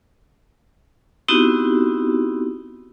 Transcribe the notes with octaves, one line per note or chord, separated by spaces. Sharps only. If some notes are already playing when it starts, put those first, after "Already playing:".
B3 C4 D#4 E4 F#4 G4